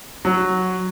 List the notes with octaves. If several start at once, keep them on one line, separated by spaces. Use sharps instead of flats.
F#3